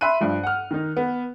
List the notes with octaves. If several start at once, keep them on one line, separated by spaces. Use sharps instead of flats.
E5 B5 C6 F#6 D#7
G2 F3
F#5 F6
D#3 D#4
B3